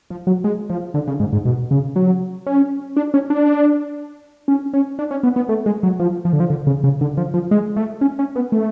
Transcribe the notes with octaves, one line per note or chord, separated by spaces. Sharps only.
F3
F#3
G#3
F3
D3
C#3
G#2
G#2
B2
C#3
F#3
C#4
D4
C#4
D4
C#4
C#4
D4
C#4
B3
B3
A3
G#3
F#3
F3
F3
D3
F3
D3
C#3
C#3
D3
F3
F3
G#3
A3
C#4
C#4
B3
A3